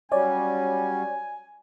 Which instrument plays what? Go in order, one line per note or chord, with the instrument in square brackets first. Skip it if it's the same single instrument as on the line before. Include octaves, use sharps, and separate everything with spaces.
[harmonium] F#3 G3 C#4 [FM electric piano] C#5 D5 [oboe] G#5